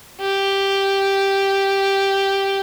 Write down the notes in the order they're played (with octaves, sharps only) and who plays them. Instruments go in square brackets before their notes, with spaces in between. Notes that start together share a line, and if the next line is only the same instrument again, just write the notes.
[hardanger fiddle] G4